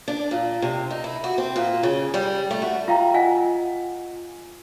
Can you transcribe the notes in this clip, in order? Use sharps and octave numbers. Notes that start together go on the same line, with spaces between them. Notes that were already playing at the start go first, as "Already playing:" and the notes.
D4
A#2
C3
D#4
E4
F#4
C4
A#2
C#3
G3
A3
F#4
F4 E5 F5 G5 A#5
F4 D#5 F#5 G#5